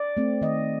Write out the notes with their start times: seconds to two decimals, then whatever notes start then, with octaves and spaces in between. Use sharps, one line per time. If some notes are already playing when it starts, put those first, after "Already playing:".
Already playing: D5
0.17 A3 C4
0.41 D#3 D#5